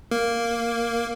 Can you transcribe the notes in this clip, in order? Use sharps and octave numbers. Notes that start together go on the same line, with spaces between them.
A#3